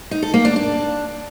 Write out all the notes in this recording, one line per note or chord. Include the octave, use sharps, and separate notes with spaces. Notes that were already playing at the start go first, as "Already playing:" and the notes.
D#4
A4
A#3
D4
D4